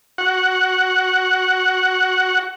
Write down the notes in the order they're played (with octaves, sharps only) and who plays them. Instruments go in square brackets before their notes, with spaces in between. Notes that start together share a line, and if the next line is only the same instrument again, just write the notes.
[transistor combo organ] F#4 F#5